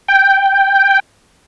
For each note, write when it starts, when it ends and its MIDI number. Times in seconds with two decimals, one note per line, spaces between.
0.08 0.99 79